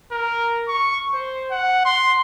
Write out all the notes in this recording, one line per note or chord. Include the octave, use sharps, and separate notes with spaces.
A#4
C#6
C5
F#5
C6